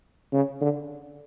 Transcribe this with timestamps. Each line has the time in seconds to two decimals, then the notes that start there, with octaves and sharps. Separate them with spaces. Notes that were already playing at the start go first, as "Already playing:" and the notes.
0.33 C#3
0.62 D3